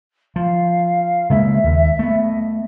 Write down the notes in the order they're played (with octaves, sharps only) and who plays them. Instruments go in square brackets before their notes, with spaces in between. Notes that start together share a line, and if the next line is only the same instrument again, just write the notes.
[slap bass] F3 [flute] F5
[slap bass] C#3 G#3 A#3 [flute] E5
[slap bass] D#2
A3 B3
[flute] D#5